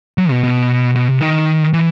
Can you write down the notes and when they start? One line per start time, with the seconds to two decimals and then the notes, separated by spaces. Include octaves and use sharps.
0.18 F#3
0.30 B2
0.44 B2
0.95 B2
1.08 C3
1.20 D#3
1.73 E3